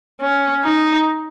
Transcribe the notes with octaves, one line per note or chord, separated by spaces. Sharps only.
C#4
D#4